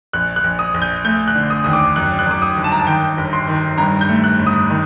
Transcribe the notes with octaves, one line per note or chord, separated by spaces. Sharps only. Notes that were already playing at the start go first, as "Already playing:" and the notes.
A#1 F#6
F#6
A#1
D#6
A#1
G6
A3 G6
F#6
D3
D#6
D#2 D#6
D6
F#2 F#6
F#6
F#2 D6
D#6
G1
A5
A#5
A5
D#3 G5
G1
C6
D#3
G2 A#5
G6
A3
F#6
G1
D#6
D#3